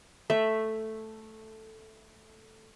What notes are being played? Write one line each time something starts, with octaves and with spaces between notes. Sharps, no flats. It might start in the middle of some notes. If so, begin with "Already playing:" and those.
A3 E5